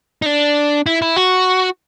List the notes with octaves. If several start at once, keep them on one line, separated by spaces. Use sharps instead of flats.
D#4
D4
E4
E4
F#4